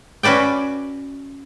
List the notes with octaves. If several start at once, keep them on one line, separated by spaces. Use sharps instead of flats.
C#4 F#4 B4 D5 G5